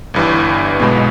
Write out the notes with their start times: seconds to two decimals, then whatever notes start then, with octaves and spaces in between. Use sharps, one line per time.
0.14 G1 G2 E3
0.80 B1 B2 G#3 B3